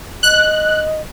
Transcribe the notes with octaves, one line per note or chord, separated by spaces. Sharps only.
D#5 F#6